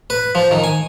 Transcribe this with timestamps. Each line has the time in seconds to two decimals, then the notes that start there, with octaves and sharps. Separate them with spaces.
0.10 B4
0.35 F3
0.51 D#3
0.64 G#5